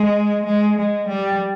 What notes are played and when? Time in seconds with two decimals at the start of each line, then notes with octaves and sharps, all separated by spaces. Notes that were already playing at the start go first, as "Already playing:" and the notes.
Already playing: G#3
0.45 G#3
0.77 G#3
1.08 G3